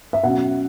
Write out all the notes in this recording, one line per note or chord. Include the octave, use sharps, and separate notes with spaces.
E5
B2 F#3 C#4 F#5